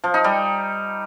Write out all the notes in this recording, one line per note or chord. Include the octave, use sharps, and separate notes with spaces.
F3
D#4
G3